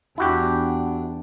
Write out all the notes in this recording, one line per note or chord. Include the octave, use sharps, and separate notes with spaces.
E2 D4 E4 F#4 G4